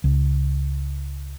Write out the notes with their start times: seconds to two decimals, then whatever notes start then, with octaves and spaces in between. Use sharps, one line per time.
0.04 C#2